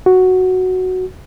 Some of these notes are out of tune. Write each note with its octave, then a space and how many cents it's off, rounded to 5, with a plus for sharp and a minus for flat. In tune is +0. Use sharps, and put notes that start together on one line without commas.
F#4 +0